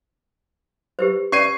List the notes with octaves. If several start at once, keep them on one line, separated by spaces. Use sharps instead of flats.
G4 B4 C5
C#4 B4 D5 C#6 C7 D#7